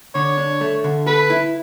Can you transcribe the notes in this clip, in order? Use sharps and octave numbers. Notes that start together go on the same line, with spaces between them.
D3 C#5
D4
A3
D3
A4 B4
E4